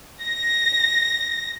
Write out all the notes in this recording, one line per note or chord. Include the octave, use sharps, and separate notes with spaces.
A#6